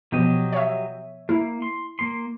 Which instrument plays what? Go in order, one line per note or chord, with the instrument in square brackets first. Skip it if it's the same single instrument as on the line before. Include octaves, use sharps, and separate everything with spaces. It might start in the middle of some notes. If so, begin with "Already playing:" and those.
[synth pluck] B2 F3 [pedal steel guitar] F#3 G4 D#5
[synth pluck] C#5 E5
[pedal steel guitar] A#3 [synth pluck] E4
[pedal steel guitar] C6
A#3 C6